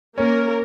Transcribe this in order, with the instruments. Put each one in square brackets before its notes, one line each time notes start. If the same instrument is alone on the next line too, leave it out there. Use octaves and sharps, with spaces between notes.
[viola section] A#3 A#4 [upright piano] C#4